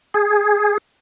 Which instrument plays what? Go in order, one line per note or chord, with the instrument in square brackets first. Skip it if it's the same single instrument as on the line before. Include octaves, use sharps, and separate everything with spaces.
[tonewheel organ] G#4